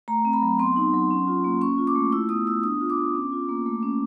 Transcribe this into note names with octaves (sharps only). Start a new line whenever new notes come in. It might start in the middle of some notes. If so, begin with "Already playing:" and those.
A3 A#5
C4
B5
F#3
B3 C6
D#4
F#3
C#4
F4
A#3
C#4 C#6
F4
D6
A3
E4 E6
B3 D#6
B3 E6
D4 D#6
F4
D6
B3
C#4
F4
A#3
A3
C#4